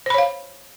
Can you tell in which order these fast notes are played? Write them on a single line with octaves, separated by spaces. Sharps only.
C5 B5 C#5 F5